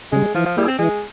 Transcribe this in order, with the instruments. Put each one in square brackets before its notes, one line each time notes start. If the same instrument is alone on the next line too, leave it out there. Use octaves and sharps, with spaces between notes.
[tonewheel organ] C#3 G3 [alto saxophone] G#3
[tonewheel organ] E3 [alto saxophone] F3
[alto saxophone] F3
[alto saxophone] G3 [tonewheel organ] A#3 E4 G#4
[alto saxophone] C4
[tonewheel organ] E3 [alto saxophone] G#3